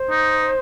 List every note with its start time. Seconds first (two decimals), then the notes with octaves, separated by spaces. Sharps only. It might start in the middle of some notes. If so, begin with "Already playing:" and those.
Already playing: C5
0.10 D#4